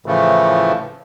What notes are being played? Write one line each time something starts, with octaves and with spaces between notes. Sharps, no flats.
A2 C#3 E3 F3 A3